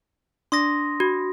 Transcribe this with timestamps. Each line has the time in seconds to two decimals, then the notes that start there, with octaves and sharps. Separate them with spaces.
0.52 D4 C6 D#6 A#6
1.00 F#4